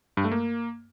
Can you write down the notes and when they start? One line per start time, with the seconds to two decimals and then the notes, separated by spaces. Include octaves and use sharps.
0.17 G2
0.24 A3
0.32 A#3